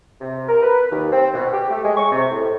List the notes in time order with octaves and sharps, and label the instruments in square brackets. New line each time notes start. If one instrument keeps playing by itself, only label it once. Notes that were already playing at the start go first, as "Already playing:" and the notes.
[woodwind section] C3
A#4
B4
D#2
C4
B2
G4
A3
G#3
C#6
C3
A2